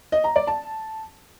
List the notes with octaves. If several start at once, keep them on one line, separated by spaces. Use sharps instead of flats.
D#5
A#5
D5
A5